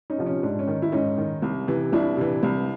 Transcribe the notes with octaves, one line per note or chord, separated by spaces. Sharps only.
C#4 D#4
C3 F3
C#4
G#2 D4
C#4
D#3
E4
G#2 C#4 D#4
D#3
C2
C3 E3
C2 D4 E4
C3 E3
C2